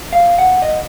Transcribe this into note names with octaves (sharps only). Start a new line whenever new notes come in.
F5
F#5
D#5